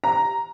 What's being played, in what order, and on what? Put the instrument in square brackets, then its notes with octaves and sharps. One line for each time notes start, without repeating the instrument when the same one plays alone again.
[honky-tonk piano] A#5